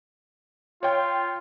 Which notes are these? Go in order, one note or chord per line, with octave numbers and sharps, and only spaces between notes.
F4 C#5 G5